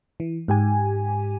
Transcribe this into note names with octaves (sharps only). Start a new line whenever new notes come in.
E3
G#2 G4 G#5